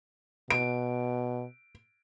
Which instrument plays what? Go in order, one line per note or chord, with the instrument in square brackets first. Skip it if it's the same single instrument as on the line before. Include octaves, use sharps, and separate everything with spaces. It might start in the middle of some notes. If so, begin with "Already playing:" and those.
[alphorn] B2 [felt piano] D7